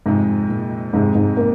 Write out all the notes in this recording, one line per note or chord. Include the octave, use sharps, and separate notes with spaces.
F2 G#2 C3 G#3 D#4
A#2
F2 G#2 C3 G#3 D#4
G#2
A#3